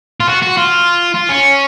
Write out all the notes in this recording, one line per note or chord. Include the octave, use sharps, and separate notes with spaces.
F4
F#4
F#4
F4
F4
C#4